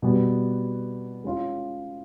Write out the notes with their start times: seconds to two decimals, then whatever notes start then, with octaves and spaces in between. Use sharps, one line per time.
0.02 B2 G3 B3
1.24 G#3 C#4 F4